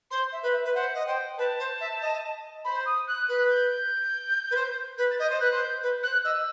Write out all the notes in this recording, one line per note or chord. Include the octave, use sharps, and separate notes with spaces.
C5 C6
E5
B4
E5
B4
C5 F#5
D#5
C5 G5
B4 A5
C5
E5
D#5
C5 B5
D#6
F#6
B4 F#6
G6
G6
B4
C5
B4
A6
D#5 G6
C5
B4 F#6
C5
G6
B4
C5 F#6
D#5 E6